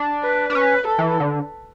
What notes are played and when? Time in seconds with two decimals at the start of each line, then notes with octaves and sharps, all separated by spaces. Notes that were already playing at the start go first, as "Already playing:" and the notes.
Already playing: D4
0.24 B4
0.50 D4
0.55 C#4 B4
0.87 A4
0.98 E3
1.20 D3